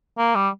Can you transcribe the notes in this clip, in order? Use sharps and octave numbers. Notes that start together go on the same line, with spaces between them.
A#3
G3